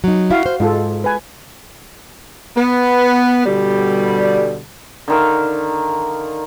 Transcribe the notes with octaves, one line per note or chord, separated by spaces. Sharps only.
F#3 D#4
E4 F#4 F5
C5
G#2 G#3 F4 A4
B4 G#5
B3
B2 D3 G3
D3 D#3 F5